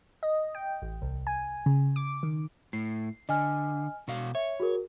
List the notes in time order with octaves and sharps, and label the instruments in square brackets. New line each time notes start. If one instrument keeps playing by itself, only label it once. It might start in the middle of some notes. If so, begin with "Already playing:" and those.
[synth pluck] D#5
G5
A1
C2
G#5
C#3
D6
D#3
[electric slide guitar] A2 [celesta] C7
[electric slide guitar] D3 [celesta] D#5 G#5 F6
[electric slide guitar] B2 F#4 F5
[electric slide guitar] C#5 [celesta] E5
[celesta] F#4 G#4 A#4